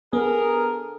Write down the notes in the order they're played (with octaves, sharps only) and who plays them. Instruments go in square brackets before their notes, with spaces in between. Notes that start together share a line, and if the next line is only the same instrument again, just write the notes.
[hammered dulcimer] D3 [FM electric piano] B3 [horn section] G#4 A#4